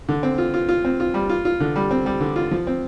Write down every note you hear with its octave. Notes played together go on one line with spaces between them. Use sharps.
D3
C4
F4
F4
F4
C4
F4
G3
F4
F4
D3
G3
C4
G3
D3
F4
F3
C4